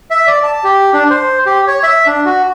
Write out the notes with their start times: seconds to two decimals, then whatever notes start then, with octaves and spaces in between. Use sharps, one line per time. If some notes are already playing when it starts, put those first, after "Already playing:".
0.11 E5
0.27 D5
0.43 A5
0.64 G4
0.93 D4
1.10 C5
1.46 G4
1.67 C#5
1.83 E5
2.06 D4
2.25 F#4